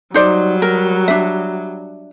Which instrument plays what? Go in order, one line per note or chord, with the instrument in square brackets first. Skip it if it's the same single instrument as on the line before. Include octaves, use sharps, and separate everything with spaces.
[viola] F#3 G3 [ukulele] D#4 C5 D5
[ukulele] A#4
D4 E5